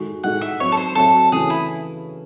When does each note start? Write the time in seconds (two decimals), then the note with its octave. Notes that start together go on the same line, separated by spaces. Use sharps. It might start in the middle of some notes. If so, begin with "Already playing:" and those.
Already playing: D#3 G#3 F#4 A4
0.24 A2 G#3 D#4 F#4 A4 F#5
0.41 E5
0.60 F#3 C4 D#4 C#5
0.72 A4
0.77 C5
0.95 F#3 C4 F#4 A4 C#5 E5
1.32 C#3 E3 A3 C#4 G#4
1.50 E4